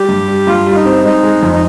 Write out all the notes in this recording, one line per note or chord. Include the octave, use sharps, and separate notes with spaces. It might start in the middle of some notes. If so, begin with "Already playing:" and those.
Already playing: G3 G4
G2
G3
G2 F4
G3
F4
D#4
C4
G#3 D#4
G#3
F2
D#4